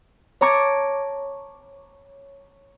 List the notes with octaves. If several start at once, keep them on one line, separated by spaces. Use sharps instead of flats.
C#5 A5 A#5 C#6 D6 G#6